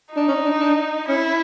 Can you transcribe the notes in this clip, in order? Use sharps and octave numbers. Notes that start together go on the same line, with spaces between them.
D4 D#4
C#4
D4
D4
C#4 E4